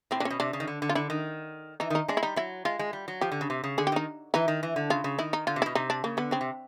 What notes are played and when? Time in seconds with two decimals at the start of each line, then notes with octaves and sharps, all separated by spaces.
0.11 A2 C4
0.20 A#2 D4
0.25 C#4
0.30 B2
0.40 C3 D4
0.53 C#3
0.60 D#3
0.68 D3
0.82 D3
0.89 F4
0.95 D3 E4
1.10 D#3
1.80 E3 D#4
1.90 D#3
1.95 D#4
2.08 G#3 D4
2.17 E4
2.23 G3 D#4
2.36 F#3 E4
2.65 G#3 F4
2.79 G#3
2.93 G3
3.08 F#3
3.21 F3 G4
3.32 D3
3.41 C#3
3.50 C3
3.64 C#3
3.78 D3 G#4
3.87 G4
3.92 D#3 D#4
4.34 E3 D#4
4.48 D#3
4.63 E3
4.76 D3
4.90 C#3 F4
5.04 C#3
5.18 D#3 E4
5.33 D#4
5.47 D3 F4
5.56 C3
5.62 B2 E4
5.75 C3 D#4
5.90 D4
6.04 C#3 A#3
6.17 D3 B3
6.31 C#3 C4
6.41 C3